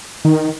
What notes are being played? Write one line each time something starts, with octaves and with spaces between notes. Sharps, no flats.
D#3